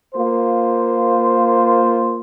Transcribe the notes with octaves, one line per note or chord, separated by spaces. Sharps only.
A#3 F4 C5